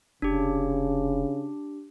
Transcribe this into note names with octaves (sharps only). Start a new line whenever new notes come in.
F1 C#3 D4 G4